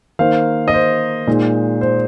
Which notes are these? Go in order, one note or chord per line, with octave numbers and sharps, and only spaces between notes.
D#3 A#3 D#4 C5 F5
D#5
C5
A#2 G#3 D#4
C5